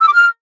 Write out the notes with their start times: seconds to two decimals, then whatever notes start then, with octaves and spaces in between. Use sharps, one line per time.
0.01 E6
0.07 D6
0.13 F6